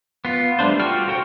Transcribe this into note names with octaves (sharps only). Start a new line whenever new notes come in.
B3 F4
G3 A3 D4 C5
F4 F#4 G5 F6
F#4 A4 C5 F#5 G5